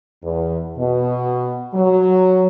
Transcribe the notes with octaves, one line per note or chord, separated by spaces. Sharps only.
E2
B2
F#3